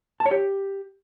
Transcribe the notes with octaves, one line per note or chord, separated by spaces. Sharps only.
A5
C#5
G4